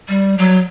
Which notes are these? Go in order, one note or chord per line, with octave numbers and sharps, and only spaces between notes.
G3
F#3